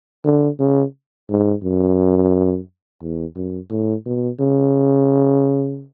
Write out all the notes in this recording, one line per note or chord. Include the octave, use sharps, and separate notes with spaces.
D3
C#3
G#2
F#2
E2
F#2
A2
B2
C#3